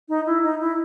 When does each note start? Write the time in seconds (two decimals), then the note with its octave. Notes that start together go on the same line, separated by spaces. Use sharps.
0.09 D#4
0.26 E4
0.43 D#4
0.60 E4